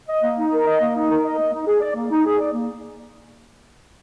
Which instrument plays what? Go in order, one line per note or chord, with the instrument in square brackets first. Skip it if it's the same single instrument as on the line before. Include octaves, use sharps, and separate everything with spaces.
[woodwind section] D#5
A#3
D#4
A#4
D#5
A#3
D#4
A#4
D#5
A#3
D#4
G#4
D5
A#3
D#4
G#4
D5
A#3